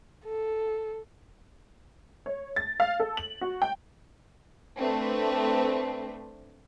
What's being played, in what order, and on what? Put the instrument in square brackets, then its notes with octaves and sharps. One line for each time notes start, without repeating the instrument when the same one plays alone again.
[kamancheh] A4
[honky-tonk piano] C#5
A6
F5
A4
F#7
F#4
G5
[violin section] A3 C4 D4 B4